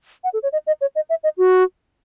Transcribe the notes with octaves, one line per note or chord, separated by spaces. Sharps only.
F#5
A4
C#5
D#5
D#5
C#5
D#5
E5
D#5
F#4